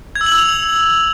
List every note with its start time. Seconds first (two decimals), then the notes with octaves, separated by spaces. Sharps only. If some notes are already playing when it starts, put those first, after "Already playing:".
0.15 G#6
0.21 E6
0.26 F#7
0.32 E6
0.37 F7